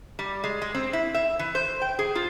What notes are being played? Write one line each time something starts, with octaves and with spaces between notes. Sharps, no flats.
G3
G#3
G#3
C4
E4
E5
E3
C5
G5
G#4
F4